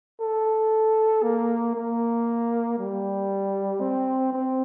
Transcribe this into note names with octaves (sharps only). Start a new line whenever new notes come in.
A4
A#3
A#3
G3
C4
C4